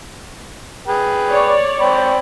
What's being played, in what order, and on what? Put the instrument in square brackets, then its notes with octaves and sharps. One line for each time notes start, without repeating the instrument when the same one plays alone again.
[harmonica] G#4 B4 G5
[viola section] C#5 D5
[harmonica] C4 G5 B5